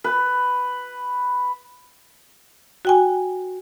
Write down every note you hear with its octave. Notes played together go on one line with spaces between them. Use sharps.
B4
F#4 G5 G#5